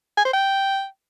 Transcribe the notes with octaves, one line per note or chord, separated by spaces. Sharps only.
G#5
C5
G5